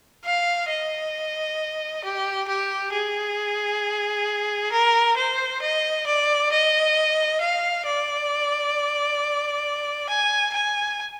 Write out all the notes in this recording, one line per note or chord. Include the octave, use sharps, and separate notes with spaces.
F5
D#5
G4
G4
G#4
A#4
C5
D#5
D5
D#5
F5
D5
G#5
G#5